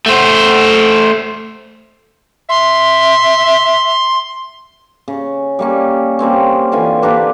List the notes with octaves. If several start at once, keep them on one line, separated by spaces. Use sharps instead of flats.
A3 C5
E5 C6
C#3
G3 A#3 C#4
G3 A#3 C4 C#4
D3 E3 F4 G#5
A#3 D4 G4 B4